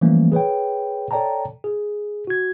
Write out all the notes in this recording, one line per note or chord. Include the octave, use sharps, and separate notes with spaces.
E3 F3 G3 A3 A#3 C#4
G#4 B4 C#5 G5
A4 C#5 D5 G5 A5 A#5
G#4
F#4 G#6